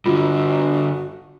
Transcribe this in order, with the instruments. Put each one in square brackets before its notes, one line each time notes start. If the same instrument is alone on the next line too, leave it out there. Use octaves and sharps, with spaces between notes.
[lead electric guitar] G2 D3 [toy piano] F4 [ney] F#4